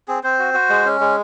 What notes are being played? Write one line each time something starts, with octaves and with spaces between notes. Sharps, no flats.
C4 G#4
C4 C5
F#4
F#4
G#3
C#4
G#3